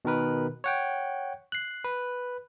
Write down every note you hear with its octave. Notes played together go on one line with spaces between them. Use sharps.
B2 D#3 A#4 B4
C#5 F#5 G5
F#6 C7
B4